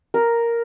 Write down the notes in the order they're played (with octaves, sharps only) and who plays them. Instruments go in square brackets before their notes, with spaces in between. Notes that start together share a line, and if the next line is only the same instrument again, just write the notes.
[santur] A#4